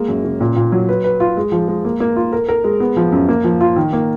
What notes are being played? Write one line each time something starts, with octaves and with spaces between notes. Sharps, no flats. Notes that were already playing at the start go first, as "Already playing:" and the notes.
Already playing: G#3 A#3
F#2
C#3
A#2
A#2
F#3
B4
B4
F4
G#3
F3
G#3
A#3
A#3
F4
A#4
A#4
G#3
B3
F3
F#2
A#3
F3
F4
D#3
A#3